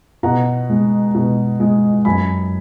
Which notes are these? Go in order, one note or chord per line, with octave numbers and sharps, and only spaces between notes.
B2 F#5 A#5
G#3
B2
G#3
F#2 G#5 B5